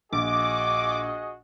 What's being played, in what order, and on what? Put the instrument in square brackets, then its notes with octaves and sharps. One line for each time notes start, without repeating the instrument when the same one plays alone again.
[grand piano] A#1 [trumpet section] F#4 G#4 D#5 [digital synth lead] D6